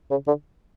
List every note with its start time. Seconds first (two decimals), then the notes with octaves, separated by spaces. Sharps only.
0.11 C#3
0.27 D3